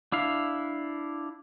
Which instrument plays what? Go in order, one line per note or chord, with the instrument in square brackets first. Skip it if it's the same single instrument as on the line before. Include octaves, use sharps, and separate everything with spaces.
[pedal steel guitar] D4 E4 F5